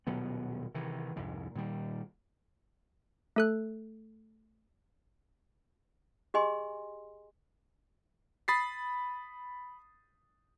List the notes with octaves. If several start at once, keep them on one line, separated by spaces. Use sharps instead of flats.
D#1 B2 F#3 B3
C3 D#3 E3
C2 F2 G#2
A#2 D#3 F#3 G3
A3 A4 F#6
G4 G#4 D#5 G#5 C6
B5 D#6 A6 B6 C7